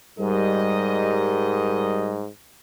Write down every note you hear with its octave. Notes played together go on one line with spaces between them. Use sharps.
G#2 G3 A#4 D#5